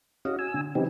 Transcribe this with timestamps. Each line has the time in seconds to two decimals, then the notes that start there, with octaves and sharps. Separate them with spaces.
0.25 C#4 F#4 D#5 F5
0.39 G#5 E6
0.54 D3
0.75 C#3 E3 F#3 C4 D#4 G4